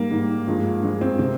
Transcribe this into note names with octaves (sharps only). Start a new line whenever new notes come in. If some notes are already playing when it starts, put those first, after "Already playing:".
Already playing: G#2 G3 A#3
G#2 G3
G2 F3 G#3
G2 F3 G#3
C4
C3 C4